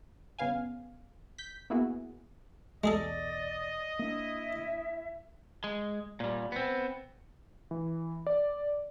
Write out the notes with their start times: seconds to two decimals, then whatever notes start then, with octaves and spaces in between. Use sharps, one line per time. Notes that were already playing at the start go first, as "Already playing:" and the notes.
0.39 G1 C#3 B3 F5 G#5
1.38 G6 B6
1.70 A#3 B3 E4 F#4 G#4
2.84 B1 E2 G#3 G#4 A4 D5 D#5
3.99 A#3 D4 E4 E5
5.64 G#3
6.20 A#2 G3
6.52 B3 C4
7.71 E3
8.27 D5